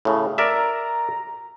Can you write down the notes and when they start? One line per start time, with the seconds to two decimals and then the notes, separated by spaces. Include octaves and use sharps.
0.05 A2 C#3
0.38 A#4 D5 E5 A#5